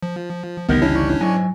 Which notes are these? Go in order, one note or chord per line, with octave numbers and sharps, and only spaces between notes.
F3
G1 C#2 E3 A#3 B3 D#4 G4 A#4
C#4 D4 E4 C#5
G#2 F#3 G#5